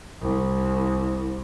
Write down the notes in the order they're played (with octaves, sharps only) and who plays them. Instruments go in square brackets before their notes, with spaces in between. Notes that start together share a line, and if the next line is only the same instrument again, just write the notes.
[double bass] C2